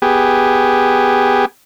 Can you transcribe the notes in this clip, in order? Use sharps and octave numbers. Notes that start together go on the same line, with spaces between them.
B3 G4 G#4